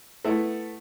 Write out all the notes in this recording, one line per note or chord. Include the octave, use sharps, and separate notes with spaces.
A3 B3 E4 E5